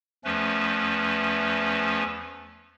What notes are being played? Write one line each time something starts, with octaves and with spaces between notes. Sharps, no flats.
E2 F3 A3 C#4 B4